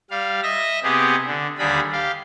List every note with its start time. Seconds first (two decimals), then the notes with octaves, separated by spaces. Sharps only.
0.10 G3 F5
0.43 D#5 E5 A#6
0.83 C3 B3 G4 G#4
1.27 D3
1.59 D#2 D3 G3 G#4 B5
1.92 G4 F5